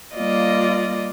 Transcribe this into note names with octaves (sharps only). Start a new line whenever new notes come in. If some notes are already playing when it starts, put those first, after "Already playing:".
G3 A#3 F4 D5 D#5